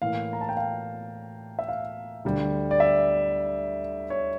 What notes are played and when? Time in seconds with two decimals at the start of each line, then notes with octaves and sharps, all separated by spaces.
0.02 A2 E3 A#3 F5
0.33 A#5
0.41 A5
0.49 G5
0.57 F5
1.59 E5
1.69 F5
2.25 D2 D3 G3
2.71 D5
2.80 E5
4.10 C#5